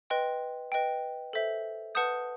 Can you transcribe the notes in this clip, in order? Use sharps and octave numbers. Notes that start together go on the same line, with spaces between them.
B4 D#5 G5 C6
B4 D#5 G5
A4 C5 E5
B4 F#5 A5 D#6 G6